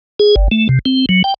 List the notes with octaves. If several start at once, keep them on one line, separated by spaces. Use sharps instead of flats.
G#4
G1
A3
C3
C4
F#3
G5